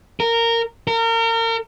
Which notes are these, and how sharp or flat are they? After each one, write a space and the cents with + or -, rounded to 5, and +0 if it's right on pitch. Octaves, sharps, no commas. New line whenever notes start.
A#4 -15
A#4 -35